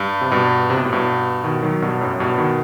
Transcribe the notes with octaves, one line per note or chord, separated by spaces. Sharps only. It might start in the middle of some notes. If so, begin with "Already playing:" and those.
Already playing: G2
C3
G2 B2
C3
B2
A2
G2 B2
B2 D#3
D#3 F#3
G2 B2
F#2 A2
G2 B2
B2 D#3